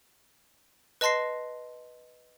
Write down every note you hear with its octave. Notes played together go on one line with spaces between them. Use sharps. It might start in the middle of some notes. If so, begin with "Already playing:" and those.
B4 D#5 A5 C6 A#6 C7